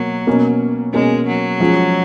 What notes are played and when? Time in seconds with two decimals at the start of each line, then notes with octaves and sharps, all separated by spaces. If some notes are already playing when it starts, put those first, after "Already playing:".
Already playing: B2 F#3 A#3
0.27 B2 A#3 C#4
0.94 B2 G#3 A#3 C#4
1.27 F#3
1.60 F3 G#3 C#4